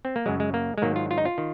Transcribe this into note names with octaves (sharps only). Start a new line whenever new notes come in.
C4
A#3
F#2 C#3 F#3 G#3
G#3
A#3
G#3
G#2 D#3 F#3 A#3
F4
F4
D#4
F4
D#3